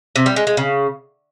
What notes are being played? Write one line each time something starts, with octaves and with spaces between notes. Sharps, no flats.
C3
G3
G#3
G#3
C#3